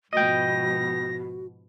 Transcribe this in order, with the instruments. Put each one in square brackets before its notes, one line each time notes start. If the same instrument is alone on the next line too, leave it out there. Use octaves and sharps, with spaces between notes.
[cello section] G#2 B2 F3 [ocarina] F#4 [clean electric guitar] D#5 G5 [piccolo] A#6